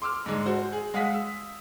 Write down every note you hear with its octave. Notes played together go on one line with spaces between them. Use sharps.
C6 D6 E6 F6
G#2 D3 G#3
F#4 C5
G#4
G#3 F5 F#5 D#6 B6
E6